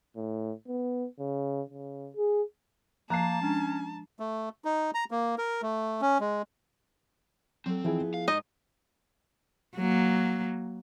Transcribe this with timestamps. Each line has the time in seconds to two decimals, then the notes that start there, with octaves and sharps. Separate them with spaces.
0.16 A2
0.68 B3
1.20 C#3
1.70 C#3
2.16 G#4
3.10 F3 A#3 A5 A#5 F#6 C7
3.42 G#3 C#4 D4
4.20 A3
4.65 D#4
4.94 A#5
5.11 A#3
5.38 A#4
5.62 A3
6.02 C#4
6.20 G#3
7.66 F#3 C4 A4
7.84 E3 F3 D#4 E4 G#4 G5
8.00 B3
8.14 F5
8.28 G#2 D#4 D#5
9.77 F#3 A#3